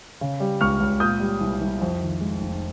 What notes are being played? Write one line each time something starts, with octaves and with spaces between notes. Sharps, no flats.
C#3
G3
C#2 C#6 F6
C#2
A#2 D#6 G6
G3
C2
C2
F2
D#3
G#3
F1